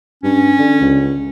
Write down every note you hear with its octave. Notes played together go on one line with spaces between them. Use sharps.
G2 C#4
D3
C#2